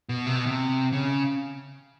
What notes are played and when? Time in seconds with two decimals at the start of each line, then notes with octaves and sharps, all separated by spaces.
0.09 B2
0.27 C3
0.36 B2
0.46 C3
0.93 C#3